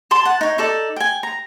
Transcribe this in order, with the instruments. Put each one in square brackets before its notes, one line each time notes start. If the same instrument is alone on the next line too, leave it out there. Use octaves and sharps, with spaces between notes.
[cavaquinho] A5 C6 D6
F#5 A5
D#4 C#5
D#4 A4 D5
G5 G#5
A#5